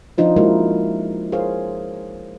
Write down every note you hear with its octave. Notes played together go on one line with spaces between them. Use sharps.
F3 D4 D#4 F4 C5
G#3 A#3 D#4 E4 F#4 A#4
D#4 G#4 A#4 C5 C#5 F5